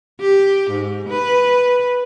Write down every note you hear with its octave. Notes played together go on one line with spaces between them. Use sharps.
G4
G#2
B4